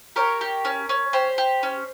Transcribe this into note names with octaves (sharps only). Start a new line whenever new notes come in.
G4 A#4 C#5
G4
C#4
C#4
G4 C5
G4
C#4